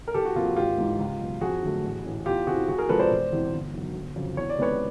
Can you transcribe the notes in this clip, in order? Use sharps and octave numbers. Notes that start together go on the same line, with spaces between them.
A#4
C2 G4 A4
F#4
C3 F3 A#3 F4
F#4
G#1 F4 G4
G#2 E3
C#2
B2 F#3
F2 F#4 G#4
D3 F#3 A3
A1
A2 E3
E2 F4 G4
C3 E3 F#4 G#4
C2 F#4 G#4
G#4 A#4
C3 F3 G#3 A4 B4
C5 D5
E1
E2 C3 E3
G1
F#2 D#3 F#3
G1
F2 C#3 F#3
E2 C#5
D5
C3 D#3 G#3 B3 B4 C#5